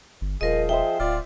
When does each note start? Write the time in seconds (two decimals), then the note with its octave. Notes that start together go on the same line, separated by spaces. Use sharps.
0.21 G1
0.41 D#1 F3 G#4 A#4 D#5
0.69 C5 D#5 E5 G5
0.99 D1 F4 D5